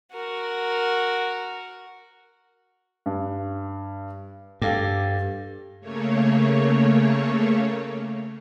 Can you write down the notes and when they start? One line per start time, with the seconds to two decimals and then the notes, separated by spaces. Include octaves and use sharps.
0.12 F#4 A#4
3.06 G2
4.62 G2 G4 A4 F5
5.81 C#3 A3 A#3 C#5